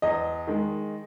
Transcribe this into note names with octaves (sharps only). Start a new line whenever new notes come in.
E2 D#5
D#3 G#3